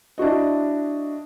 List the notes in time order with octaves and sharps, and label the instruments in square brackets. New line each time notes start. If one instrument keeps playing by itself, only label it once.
[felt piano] D4 E4 F#4 D#5